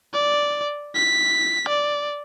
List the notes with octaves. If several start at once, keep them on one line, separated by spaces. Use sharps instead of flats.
D5
B6
D5